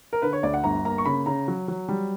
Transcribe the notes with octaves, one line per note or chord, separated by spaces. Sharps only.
A#4
D3 B4
C#5
D2 D5
F#5
G1 A#5
A#3 A#5
C#6
C#3 B5
C#3 A#5
F#3
F#3
G3